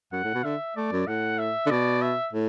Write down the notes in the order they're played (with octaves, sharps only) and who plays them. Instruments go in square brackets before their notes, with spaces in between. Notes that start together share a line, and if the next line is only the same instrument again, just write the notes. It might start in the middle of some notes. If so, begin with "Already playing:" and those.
[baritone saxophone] F#2 [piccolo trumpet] F#5
[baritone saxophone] A2
B2
[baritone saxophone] D3 [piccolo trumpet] E5
[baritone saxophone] A3 [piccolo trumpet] D5
[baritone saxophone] F#2
[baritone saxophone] A2 [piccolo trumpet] F#5
[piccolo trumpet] E5
[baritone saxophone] D3
[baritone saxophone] B2 [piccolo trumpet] D5
[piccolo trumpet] E5
[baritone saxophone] A2